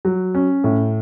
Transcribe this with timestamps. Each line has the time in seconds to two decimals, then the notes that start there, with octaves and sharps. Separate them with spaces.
0.05 F#3
0.35 C#4
0.64 A2